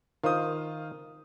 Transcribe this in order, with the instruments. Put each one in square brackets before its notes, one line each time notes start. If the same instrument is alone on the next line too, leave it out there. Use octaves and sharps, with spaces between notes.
[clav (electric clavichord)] D#3 [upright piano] F4 C5 D#6